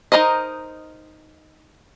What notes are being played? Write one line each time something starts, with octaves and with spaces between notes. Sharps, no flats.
D#4 F#4 A#4 C5 D#5